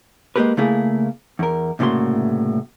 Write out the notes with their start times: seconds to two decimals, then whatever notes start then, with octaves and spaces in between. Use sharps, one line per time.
0.36 G#3 A#3 D4 G4 A#4 B4
0.57 C#3 A3 A#3 E4 G#4 F5
1.39 E2 A#4
1.79 C2 A2 C#3 A#3 F#4 C6